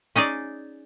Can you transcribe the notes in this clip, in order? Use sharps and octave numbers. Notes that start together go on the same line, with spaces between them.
C#4 D#4 G#4 D5